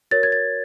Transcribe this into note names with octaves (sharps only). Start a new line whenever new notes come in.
F#4 A#4 C#5 A6
G#6
A6